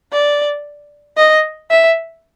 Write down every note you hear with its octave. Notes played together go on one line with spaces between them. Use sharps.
D5
D#5
E5